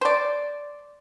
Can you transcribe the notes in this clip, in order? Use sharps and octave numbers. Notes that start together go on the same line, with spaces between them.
C5 D5